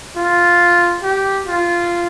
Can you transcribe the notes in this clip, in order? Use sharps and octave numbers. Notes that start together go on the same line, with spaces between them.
F4
G4
F4